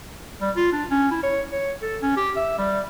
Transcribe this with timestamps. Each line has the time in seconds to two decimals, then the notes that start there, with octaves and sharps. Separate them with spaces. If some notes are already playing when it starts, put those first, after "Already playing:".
0.41 G3
0.56 F4
0.73 D4
0.91 C#4
1.11 E4
1.23 C#5
1.51 C#5
1.82 A4
2.02 C#4
2.17 G4
2.36 E5
2.58 G3